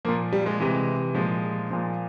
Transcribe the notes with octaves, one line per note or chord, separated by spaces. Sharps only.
A#2 F3 A#3
G3
G#3
C3 E3
A#2 F3 G#3
A#2 F3